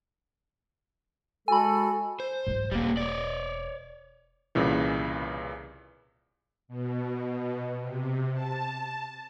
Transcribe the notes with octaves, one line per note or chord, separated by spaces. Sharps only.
G#3 F#4 A4 G#5 B5
C5
G#2 F#3
E1 G3 A#3
C#5 D5
C2 A#2 C#3 E3
B2
C3
A5